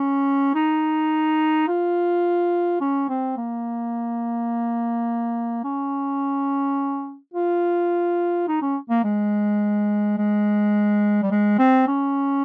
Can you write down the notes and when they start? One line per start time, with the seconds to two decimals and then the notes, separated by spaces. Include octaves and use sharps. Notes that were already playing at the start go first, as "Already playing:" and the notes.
Already playing: C#4
0.54 D#4
1.67 F4
2.81 C#4
3.09 C4
3.37 A#3
5.64 C#4
7.34 F4
8.48 D#4
8.62 C#4
8.90 A#3
9.04 G#3
10.18 G#3
11.23 G3
11.31 G#3
11.59 C4
11.87 C#4